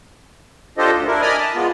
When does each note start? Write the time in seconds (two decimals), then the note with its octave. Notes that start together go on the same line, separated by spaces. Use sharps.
0.78 D4 F4 G4 A4 C5 D#5
0.93 D2
1.07 D4 E4 A#4
1.22 D5 D#5 G#5 B5 D#6 F6
1.39 A5
1.55 G#3 B3 F4